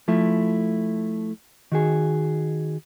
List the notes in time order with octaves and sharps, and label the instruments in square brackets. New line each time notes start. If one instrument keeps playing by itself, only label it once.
[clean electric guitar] F3 A3 E4
D#3 F#4 G#4